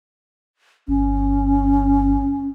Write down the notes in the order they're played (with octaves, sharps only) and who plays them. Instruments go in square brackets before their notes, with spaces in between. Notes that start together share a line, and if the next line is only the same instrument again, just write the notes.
[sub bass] G1 [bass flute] C#4